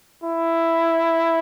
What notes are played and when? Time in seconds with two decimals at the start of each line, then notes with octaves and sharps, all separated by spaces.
0.23 E4